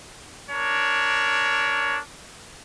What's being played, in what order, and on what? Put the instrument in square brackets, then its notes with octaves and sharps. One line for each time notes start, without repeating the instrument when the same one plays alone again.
[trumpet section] D4 A#4 C#5